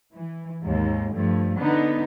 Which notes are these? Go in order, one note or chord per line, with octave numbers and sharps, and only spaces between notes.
E3
D#2 G#2
G2 F3 A3
D3 B3 D#4